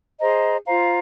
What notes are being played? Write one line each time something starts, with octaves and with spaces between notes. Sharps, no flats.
G#4 C5 D#5 A#5
F4 C5 F5 A#5